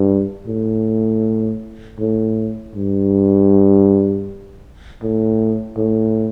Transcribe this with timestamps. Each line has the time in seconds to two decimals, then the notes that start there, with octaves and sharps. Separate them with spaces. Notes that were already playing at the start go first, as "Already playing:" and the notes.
Already playing: G2
0.47 A2
1.99 A2
2.75 G2
5.03 A2
5.77 A2